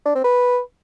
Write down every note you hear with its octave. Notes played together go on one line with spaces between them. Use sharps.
D4
C4
B4